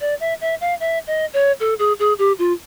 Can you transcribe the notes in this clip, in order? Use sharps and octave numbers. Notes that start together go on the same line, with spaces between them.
D5
E5
E5
F5
E5
D#5
C#5
A4
G#4
G#4
G4
F4